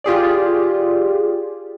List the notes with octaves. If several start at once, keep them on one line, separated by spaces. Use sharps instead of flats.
F4 G4 G#4 D5